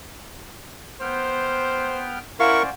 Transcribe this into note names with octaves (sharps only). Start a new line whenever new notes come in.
B3 C5 G5 F6
C#4 E4 A#4 C5 D5 F5 F#5 C#6